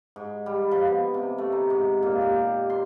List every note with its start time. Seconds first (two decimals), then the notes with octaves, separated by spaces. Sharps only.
0.16 G#2
0.46 G3
0.71 F3
0.87 B3
1.14 C3
1.38 A3
1.52 D#4
1.70 G#2
2.03 A#2
2.21 G4
2.70 C6